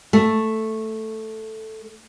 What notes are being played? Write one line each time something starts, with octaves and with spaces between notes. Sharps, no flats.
A3